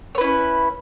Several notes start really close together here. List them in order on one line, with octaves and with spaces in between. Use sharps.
C#5 B4 E4 C#4